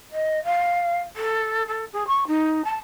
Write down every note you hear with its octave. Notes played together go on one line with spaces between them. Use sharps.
D#5
F5
A4
A4
G#4
C#6
D#4
A5